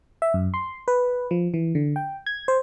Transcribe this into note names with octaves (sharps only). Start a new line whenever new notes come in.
E5
F#2
C6
B4
F3
E3
D3
G5
G#6
C5